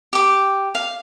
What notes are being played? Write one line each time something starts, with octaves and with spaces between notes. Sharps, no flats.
G4 D6
F5